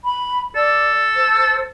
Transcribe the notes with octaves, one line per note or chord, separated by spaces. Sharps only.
B5
A4 D5
C5